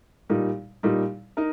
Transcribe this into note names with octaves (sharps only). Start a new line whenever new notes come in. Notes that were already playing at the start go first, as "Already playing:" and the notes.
A#2 G3 D#4
A#2 G3 D#4
D#4 A#4